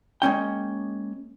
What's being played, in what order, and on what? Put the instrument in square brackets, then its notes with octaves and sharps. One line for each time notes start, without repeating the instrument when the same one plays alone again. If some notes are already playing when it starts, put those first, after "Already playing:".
[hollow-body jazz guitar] G#3 A#3 C#4 G5